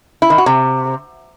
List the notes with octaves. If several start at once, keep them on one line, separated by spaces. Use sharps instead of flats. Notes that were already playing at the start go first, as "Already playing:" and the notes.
E4
D#3
F#4
C3